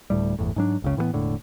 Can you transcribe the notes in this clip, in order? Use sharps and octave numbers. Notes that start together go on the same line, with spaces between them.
D1 D2 A2 G3
G1 E2 A2
G#2 F#3 D4
F#1 C#2 C#3
A2 E3 F3 B3
E1 A2 D3